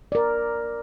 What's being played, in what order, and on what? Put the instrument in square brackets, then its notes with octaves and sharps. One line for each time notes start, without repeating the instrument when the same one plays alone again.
[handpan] A#4 D5